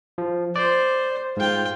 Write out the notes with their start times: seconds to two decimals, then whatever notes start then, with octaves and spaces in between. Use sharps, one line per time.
0.18 F3
0.56 C5 D5
1.37 G#2 F4 G5